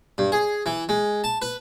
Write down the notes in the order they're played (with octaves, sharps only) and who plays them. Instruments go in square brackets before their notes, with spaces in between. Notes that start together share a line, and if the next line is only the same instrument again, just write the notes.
[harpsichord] G2
G#4
E3
G#3
A5
B4